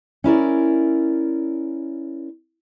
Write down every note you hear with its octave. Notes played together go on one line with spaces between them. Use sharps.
C#4 E4 A#4 D5